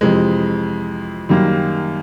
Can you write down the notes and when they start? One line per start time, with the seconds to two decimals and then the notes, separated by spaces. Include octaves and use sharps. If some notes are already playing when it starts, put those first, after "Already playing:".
0.01 F2 C3 E3 G#3
1.29 F#2 D#3 G3 A#3